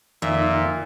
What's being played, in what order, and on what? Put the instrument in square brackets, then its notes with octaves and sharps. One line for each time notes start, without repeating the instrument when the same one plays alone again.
[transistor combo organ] F2 D#3 [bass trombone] A#2 [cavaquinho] E5